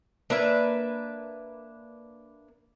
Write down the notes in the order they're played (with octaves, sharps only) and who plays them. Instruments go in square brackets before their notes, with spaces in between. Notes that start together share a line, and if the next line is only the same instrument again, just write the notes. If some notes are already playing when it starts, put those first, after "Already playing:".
[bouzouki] A#3 D4 B4 E5